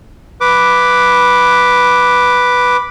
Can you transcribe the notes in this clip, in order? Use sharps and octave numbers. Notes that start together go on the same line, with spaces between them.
B4 D6